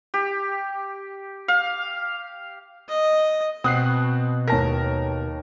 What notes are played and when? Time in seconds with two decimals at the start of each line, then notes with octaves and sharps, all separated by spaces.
0.14 G4
1.48 F5
2.89 D#5
3.64 B2 C4 F#5 D#6 F#6 C7
4.48 D#2 A#4 A5 A#6